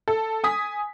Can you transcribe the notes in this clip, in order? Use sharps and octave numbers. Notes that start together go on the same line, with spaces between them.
A4
G#5 D#6 B6